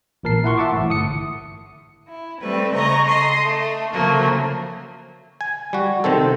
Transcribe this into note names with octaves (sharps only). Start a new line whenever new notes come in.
A1 A#2 A#4 A5 C7
E4 F#5 C6 C#6
E5 F#5 A5 D6
A1 A2
G1 D#6 C#7
E4
G3 A3 C4 B4
C#3 D#5 A#5 C#6
A4 D#5 C6
A3
C#3 F3 F#3 A3 A#3
G#5
G3 F#4
C3 D#3 C4 A4